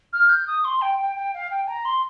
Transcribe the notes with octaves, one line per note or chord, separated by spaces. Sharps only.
F6
G6
D#6
C6
G5
G5
G5
F5
G5
A#5
C6